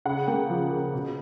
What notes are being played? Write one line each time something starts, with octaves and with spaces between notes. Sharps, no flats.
C#3 F#5
A#3 G5
F3
C#3
B2